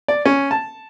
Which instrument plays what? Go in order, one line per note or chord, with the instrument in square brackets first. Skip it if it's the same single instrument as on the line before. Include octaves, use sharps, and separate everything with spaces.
[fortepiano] D5
C#4
A5